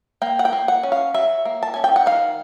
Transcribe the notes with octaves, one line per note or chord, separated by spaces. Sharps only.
A#3 G5
F#5
G5
A#3
F#5
C#4
F5
F#3 E5
A#3
A5
C#4 G#5
G5
F#5
D#3 F5